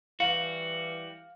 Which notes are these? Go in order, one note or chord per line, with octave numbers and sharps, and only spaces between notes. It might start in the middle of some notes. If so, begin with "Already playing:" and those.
E3 G3 F#4 F5